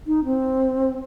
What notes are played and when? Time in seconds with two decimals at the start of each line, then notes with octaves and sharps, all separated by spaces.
0.07 D#4
0.25 C4